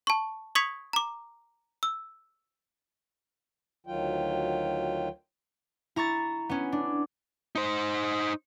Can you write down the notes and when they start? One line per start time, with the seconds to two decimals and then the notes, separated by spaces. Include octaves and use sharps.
0.07 A5 C#6
0.55 C#6 D#6 G#6 B6 C#7 F7
0.93 A#5 D6
1.83 E6
3.87 D2 D#3 F#3 F4 G5
5.96 E4 A#5 C#6 A6
6.49 B3 C#4
6.72 D4
7.56 D#4 C5